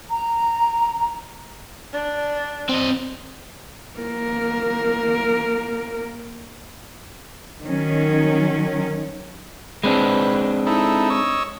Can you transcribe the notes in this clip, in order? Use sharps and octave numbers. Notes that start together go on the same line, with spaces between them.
A#5
D4
C4 D#5
A#3 A#4
D#3 F#3 C#4
G#3 C4 D4 B4
D#4 E4 A4
C#5 D#5 E6